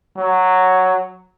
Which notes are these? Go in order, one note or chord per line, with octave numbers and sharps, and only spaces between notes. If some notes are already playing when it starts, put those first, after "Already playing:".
F#3